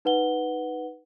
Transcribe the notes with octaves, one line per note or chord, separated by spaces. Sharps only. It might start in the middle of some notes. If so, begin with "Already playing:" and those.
D#4 B4 F#5 G7